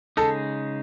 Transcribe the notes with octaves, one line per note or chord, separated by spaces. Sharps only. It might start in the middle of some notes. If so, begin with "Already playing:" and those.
C#3 G#3 D#4 A4